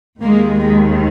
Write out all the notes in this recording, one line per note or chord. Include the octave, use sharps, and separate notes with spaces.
D#2 D#3 G#3 A#3
G#3